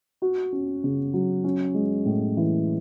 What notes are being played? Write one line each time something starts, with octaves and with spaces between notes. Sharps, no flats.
F#4
C#4
C#3
F#3
C#4
G#3
A2
E3